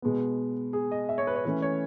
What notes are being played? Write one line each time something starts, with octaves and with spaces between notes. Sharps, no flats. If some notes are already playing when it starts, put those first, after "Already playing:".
B2 G#3 B3
G#4
D#5
E5
C#5
B4
C#5
E3 A3 C#4 B4
C#5